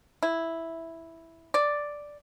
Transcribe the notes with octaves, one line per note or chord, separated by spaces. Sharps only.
E4
D5